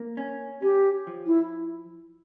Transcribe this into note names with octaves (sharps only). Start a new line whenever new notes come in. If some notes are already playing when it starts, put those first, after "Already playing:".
Already playing: A#3
C#4
C#4 G4
F3
E4